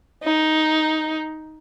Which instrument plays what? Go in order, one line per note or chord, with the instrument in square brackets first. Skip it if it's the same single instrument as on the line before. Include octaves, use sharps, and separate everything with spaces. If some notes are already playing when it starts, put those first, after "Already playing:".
[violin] D#4